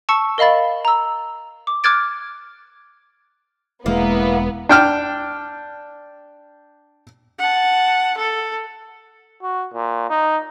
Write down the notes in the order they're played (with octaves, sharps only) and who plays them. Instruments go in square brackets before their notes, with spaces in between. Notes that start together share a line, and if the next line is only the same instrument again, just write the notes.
[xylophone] A5 C#6 E6 C#7
A#4 D#5 F5 B5 A6
A#5 E6
D6
D6 F6 F#6 G#6 A6 D7
[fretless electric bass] E1 G#3 [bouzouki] A#3 [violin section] B3 [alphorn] E4
[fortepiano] D4 G5 F6
[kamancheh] F#5 A5
A4
[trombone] F#4
A#2
D#4